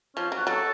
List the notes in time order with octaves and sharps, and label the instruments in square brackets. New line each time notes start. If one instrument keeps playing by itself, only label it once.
[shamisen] F3 [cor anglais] C#4
[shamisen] F#3
[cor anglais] F#4
[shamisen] F#3 [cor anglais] A4